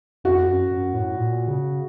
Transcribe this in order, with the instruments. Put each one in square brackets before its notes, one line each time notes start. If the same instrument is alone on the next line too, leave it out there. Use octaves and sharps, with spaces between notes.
[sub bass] F2 [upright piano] F#4
[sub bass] F#2
F#2
A2
A#2
C#3